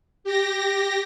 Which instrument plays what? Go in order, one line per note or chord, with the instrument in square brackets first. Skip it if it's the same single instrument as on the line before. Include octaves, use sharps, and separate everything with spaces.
[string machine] G4 A#6